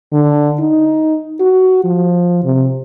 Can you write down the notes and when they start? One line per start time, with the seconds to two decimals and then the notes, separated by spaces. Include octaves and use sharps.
0.12 D3
0.60 D#4
1.40 F#4
1.84 F3
2.44 C3